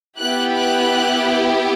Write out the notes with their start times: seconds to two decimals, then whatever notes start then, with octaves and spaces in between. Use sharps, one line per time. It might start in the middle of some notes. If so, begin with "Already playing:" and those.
0.18 B3 E4 G4 F#6
0.55 F#6